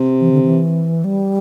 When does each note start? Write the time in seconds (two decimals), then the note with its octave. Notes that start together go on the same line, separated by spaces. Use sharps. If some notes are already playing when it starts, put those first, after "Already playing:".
Already playing: C3
0.20 E3
0.32 D3
0.43 E3
1.04 G3